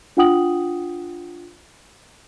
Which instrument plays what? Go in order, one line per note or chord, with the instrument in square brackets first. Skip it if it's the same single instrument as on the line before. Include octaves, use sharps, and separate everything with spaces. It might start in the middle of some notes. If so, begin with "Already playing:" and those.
[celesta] D4 F4 F#5 G5 D#6 F#7